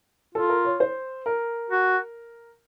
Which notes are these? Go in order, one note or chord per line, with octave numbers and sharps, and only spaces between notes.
F4 A4
A#4
C#5
C5
A#4
F#4